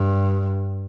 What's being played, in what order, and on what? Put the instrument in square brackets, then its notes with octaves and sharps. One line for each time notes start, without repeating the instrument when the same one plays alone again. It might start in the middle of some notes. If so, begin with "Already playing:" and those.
Already playing: [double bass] G2